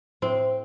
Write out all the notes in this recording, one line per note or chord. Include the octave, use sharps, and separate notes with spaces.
A2 C4